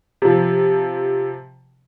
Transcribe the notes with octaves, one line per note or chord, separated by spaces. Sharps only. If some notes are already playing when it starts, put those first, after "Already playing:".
C3 F3